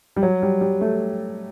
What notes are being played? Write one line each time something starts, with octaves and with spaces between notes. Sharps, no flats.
G3
F#3
G3
G3
A3